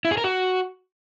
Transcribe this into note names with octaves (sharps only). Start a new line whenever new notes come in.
E4
G#4
A#4
F#4